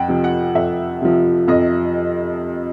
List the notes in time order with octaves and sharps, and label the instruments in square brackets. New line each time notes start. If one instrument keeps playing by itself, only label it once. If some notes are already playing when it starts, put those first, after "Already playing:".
Already playing: [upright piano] F2 F#5 G5
C3 F3
F#5
F2 E5
C3 F3
F2 D#5